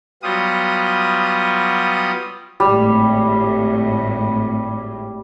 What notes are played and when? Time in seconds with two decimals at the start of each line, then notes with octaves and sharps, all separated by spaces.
0.23 F#3 G3 B3 F4 D#6
2.60 G#1 A2 G3